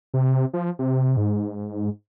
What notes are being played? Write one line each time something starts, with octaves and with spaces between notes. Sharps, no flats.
C3
F3
C3
G#2